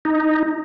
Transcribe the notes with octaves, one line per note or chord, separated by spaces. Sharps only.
D#4